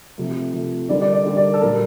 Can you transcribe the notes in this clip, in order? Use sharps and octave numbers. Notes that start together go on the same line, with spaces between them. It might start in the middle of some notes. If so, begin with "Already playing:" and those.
C3 F3 A3
C3 F3 A3
D3 G3 A#3 D5
D5
D5
D3 G3 A#3
D5
A4
A#2 G3 A#3 A#4